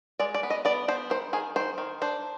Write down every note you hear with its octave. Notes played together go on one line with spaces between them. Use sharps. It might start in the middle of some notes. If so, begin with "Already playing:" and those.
G#3 D5
D5
B3
D#5
B3 D5
B3 C5
D#3 C5
D#3 G#4
D#3 C5
D#3
D4 C5